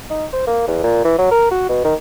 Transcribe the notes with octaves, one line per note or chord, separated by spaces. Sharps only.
D#4
C5
A#3
E2
A#2
E3
F#3
A#4
F#4
B2
D#3